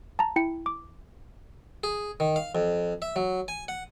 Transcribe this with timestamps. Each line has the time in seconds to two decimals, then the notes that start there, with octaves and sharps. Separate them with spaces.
0.19 A5 A#5
0.36 E4 G5 C#7
0.66 D6
1.84 G#4
2.20 D#3
2.36 F5
2.55 F2
3.02 E5
3.16 F#3
3.48 G#5
3.68 F#5